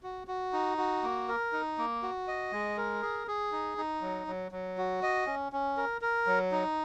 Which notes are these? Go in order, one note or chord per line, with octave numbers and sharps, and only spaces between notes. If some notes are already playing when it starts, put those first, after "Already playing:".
F#4
F#4
D#4
F#4
A#3
A#4
D#4
A#3
F#4
D#5
G#3
A#4
G#4
G#4
D#4
D#4
F#3
F#3
F#3
F#4
D#5
C#4
C#4
A#4
A#4
F#3
D#4